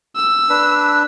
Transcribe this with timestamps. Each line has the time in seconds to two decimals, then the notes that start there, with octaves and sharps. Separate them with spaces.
0.16 E6
0.49 D4 B4